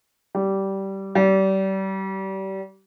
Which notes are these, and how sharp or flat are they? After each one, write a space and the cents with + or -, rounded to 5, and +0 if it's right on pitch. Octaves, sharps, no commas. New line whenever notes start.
G3 -15
G3 -30